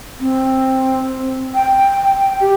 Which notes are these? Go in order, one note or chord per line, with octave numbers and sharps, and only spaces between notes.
C4
G5
G4